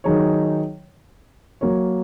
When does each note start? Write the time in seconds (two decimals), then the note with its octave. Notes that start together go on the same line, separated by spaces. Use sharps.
0.04 D#3 F#3 D#4 G#4 C#5
1.61 F#3 A#3 F#4 A#4 C#5